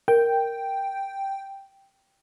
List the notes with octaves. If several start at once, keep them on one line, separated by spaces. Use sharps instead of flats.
A#4 G5